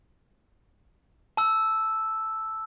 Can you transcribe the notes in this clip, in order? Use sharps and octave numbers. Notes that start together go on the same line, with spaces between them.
A5 E6